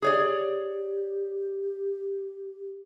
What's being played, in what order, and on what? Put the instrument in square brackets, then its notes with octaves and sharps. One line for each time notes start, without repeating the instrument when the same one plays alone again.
[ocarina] G4 [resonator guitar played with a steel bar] G#4 C#5 D5